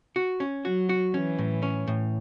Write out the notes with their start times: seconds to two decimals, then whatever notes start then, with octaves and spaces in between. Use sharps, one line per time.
0.16 F#4
0.40 C#4
0.65 F#3 F#4
0.89 F#4
1.14 E3 C#4
1.38 A2
1.63 C#4
1.88 A2